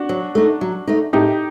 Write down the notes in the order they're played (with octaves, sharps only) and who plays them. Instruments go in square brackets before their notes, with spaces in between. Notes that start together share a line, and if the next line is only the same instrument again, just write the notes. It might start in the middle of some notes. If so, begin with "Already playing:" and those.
Already playing: [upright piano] D4 F#4
[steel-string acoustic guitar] F#3
A3 D#4
F#3
A3 D#4
[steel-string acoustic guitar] A2 [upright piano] D#4 G4